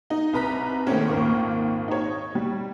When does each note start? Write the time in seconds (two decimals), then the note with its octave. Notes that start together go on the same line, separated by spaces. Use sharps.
0.10 D#4
0.33 C2 B4 A#5 B6
0.87 D#3 A3 A#3 C4 C#4
1.08 G#1 D#2 A#2 D#3 A#3 C#6
1.88 D#4 C#5
2.35 G3